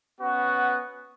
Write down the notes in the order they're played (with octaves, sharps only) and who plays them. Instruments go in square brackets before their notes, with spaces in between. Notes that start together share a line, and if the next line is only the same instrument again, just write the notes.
[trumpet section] B3 C#4 F#4